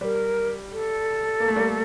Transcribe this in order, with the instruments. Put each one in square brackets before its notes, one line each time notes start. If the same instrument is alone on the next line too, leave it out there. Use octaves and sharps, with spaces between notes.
[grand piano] G3 [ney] A#4 C5
[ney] A4
[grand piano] A#3
A3
G3 A#3